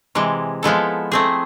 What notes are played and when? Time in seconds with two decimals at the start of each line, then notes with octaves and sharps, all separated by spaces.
0.15 C3 E3 G#3
0.63 F3 G#3 B3 E4 A4
1.12 A3 C4 G#4